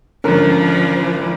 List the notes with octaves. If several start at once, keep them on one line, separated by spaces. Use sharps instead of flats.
G#1 D3 F3 C#4 A#4